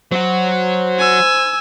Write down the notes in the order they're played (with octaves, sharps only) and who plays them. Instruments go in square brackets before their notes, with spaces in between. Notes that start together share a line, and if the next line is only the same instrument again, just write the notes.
[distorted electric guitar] F#3 F#4 [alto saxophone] C5
[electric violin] G#5 E6